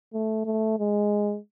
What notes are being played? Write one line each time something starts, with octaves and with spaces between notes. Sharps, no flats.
A3
A3
G#3